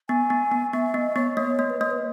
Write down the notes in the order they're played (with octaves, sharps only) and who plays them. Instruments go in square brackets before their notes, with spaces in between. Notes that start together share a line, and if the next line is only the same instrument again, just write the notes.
[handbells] B3 [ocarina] G#5
[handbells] B3
B3
[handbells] B3 [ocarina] E5
[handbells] B3 [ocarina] D#5
[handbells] B3 [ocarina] C#5
[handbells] A#3 [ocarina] C#5
[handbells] A#3
[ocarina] B4
[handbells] A#3 [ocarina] C#5
[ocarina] B4